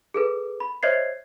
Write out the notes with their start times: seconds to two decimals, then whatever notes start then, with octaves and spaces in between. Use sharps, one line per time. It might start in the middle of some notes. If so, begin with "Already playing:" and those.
0.14 G#4 A4 B4
0.60 B5
0.83 C5 C#5 D#5 E5 G#6 C7